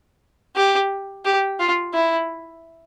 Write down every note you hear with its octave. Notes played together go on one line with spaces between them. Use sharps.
G4
G4
F4
E4